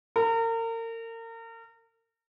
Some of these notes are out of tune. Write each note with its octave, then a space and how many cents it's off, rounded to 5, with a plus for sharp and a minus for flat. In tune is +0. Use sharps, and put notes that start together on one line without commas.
A#4 -35